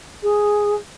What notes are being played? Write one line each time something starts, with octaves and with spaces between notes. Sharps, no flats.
G#4